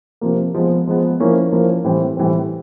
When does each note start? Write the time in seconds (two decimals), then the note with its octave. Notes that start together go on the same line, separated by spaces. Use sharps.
0.21 C3 F3 A#3
0.54 F3 G#3 B3
0.87 F3 G#3 B3
1.20 F3 A#3 C#4 E4
1.52 F3 A#3 C#4 E4
1.84 A2 E3 G3 C4
2.17 A2 E3 G3 C4